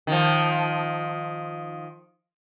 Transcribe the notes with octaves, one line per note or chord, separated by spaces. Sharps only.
D#3 F3